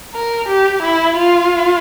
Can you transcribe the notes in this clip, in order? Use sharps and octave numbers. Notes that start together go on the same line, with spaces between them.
A#4
G4
E4
F4